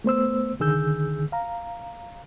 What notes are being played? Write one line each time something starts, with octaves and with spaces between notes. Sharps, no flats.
A3 B3 C5 E6
C2 D3 D#3 G#4 E6 G6
F5 A#5